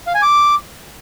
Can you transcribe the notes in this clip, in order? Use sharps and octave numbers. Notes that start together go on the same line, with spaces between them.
F5
G#5
D6